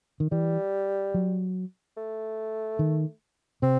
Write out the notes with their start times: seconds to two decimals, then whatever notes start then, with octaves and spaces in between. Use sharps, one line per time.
0.20 D#3
0.32 E3 G3
1.14 F#3
1.97 A3
2.79 D#3
3.62 C3 C4